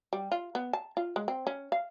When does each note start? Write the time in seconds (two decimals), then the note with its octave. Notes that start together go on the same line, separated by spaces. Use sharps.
0.13 G3
0.32 F4
0.55 B3
0.73 A5
0.97 F4
1.16 G#3
1.28 C4
1.47 C#4
1.72 F5